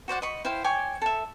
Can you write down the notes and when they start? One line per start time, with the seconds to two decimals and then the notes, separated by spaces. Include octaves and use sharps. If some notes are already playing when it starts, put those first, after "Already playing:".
0.08 F#4 C5 D5 F#5
0.22 D#5 B5 C#6
0.45 E4 C5 F5 G5
0.64 C#5 G5 G#5 D6
1.02 A4 E5